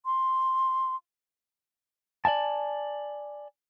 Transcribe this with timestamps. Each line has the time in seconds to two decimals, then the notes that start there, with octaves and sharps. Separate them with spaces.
0.05 C6
2.25 D5 E5 G#5 A5